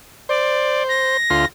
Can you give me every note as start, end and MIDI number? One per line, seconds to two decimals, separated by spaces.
0.29 1.17 72
0.29 0.83 74
0.89 1.46 94
1.30 1.45 38
1.30 1.45 65
1.30 1.45 84